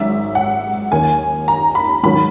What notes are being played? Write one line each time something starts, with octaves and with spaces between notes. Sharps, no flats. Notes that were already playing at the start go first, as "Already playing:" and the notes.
Already playing: G#1 G#2 F#3 C#4 E5
F#5
D#2 D#3 A#3 C#4 G#5
A#5
B5
G#2 D#3 F#3 C#4 B5